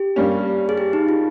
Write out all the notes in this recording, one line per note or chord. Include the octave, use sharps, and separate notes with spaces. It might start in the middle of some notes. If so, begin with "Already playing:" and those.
Already playing: G4
G2 G3 A#3 C#4
G#4
G4
D#4
F4